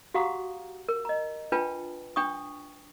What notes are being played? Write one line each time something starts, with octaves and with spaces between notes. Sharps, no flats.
F#4 G4 F5 F#5 A#5 D#6
A#4
D#5 A#5
D4 F4 B4 G5 A5
D4 G5 C#6 D#6